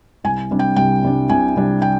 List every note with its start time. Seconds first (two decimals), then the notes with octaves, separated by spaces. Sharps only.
0.24 C2 G#5
0.51 C3 G3 D4
0.59 G5
0.76 C2 G5
1.03 C3 G3 D4
1.29 C2 G#5
1.56 C3 G3 D4
1.82 G5